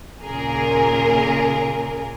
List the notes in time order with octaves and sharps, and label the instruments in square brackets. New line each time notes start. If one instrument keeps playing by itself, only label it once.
[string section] D#2 A#2 C#3 G#4 A#4